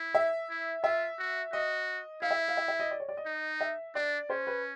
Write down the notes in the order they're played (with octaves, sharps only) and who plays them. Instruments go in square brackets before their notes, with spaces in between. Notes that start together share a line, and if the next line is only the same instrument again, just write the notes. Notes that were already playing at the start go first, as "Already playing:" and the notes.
Already playing: [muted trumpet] E4
[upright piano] E5
[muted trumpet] E4
[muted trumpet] F4 [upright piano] E5
[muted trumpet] F#4
[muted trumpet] F#4 [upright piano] D#5
[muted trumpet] E4 [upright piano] F5
[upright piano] E5
F5
E5
E5
D#5
D5
C#5
D5
D#5
[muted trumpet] D#4
[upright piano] E5
[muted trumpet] D4 [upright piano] D5
[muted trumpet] C#4 [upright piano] C5
[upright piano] B4